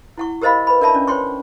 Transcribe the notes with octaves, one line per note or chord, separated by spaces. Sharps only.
E4 F#5 C#6
G4 A#4 C5 D#5 F5 B5
B4 B5
D4 A#4 D5 E5 A5 B5
C#4 D4 D5
C5 C#5 G5 C6 C#6